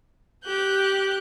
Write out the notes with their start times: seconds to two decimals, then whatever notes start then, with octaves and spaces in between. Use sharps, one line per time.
0.44 G4 F#6 G6